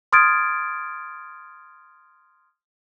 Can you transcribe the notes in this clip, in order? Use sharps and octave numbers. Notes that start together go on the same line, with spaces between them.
C6 D#6 F6 G#6 A6 D7